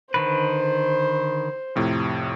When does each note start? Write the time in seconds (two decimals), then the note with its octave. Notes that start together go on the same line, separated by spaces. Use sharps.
0.14 D3 D#3 B4 C5
1.76 F2 A2 C3